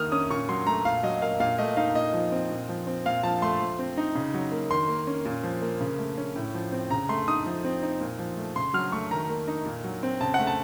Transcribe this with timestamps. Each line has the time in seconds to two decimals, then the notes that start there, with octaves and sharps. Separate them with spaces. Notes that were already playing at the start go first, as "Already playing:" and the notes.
Already playing: D#3 A#3 D#6 F6
0.12 C#4 D#6
0.30 A#2 C#6
0.49 F#3 C6
0.67 A3 A#5
0.85 A#2 F5
1.03 F#3 D#5
1.22 A#3 F5
1.40 A#2 F5
1.58 A3 D#5
1.77 D#4 F5
1.95 A#2 D#5
2.14 F3
2.32 C4
2.51 A#2
2.69 F3
2.87 C4
3.06 A#2 F5
3.23 F3 A5
3.42 A3 C6
3.61 F3
3.79 C4
3.97 D#4
4.15 C#3
4.34 F#3
4.52 A#3
4.71 D#3 C6
4.89 A#3
5.07 C#4
5.25 A#2
5.43 F3
5.62 A#3
5.80 C#3
5.99 A3
6.18 C#4
6.36 A2
6.54 F3
6.72 C4
6.91 C#3 A#5
7.09 A3 C6
7.28 D#4 D#6
7.46 F3
7.64 C4
7.83 D#4
8.01 A#2
8.19 F3
8.37 A3
8.56 C#3 C6
8.74 F#3 F6
8.92 A3 C#6
9.11 D#3 A#5
9.29 A#3
9.48 D#4
9.66 A#2
9.84 F#3
10.03 C4
10.21 C#3 A5
10.34 A3 F#5
10.47 A5